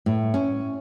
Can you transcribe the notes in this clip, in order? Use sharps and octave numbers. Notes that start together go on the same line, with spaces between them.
A2
C#4